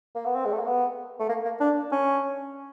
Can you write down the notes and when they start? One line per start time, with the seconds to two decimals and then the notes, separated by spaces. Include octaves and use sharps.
0.15 A#3
0.26 B3
0.35 C4
0.45 G#3
0.52 A3
0.59 A#3
0.67 B3
1.20 A3
1.29 A#3
1.45 A#3
1.60 D4
1.92 C#4